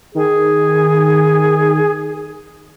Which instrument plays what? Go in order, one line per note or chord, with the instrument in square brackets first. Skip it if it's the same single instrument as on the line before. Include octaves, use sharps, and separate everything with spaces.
[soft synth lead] D#3 [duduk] G#4